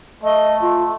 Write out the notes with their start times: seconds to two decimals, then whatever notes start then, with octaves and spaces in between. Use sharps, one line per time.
0.24 A3 D#5
0.62 F4